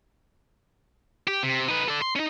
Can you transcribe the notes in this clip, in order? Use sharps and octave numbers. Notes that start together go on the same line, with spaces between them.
G4
C3
D#4 B4
A4 D5
C6
C#4 D#4